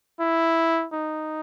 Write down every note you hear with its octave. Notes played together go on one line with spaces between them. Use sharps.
E4
D#4